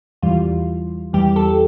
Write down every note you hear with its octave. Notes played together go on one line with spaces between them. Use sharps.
E2 E3 G3 F4
E2 E3 G3 G4
A4